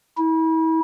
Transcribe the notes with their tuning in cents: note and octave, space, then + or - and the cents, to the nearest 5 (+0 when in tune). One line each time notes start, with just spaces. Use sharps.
E4 -35